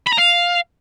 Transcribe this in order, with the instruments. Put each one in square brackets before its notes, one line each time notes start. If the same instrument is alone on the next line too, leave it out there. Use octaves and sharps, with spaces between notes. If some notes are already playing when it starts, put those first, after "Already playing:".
[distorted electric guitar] B5
A#5
F5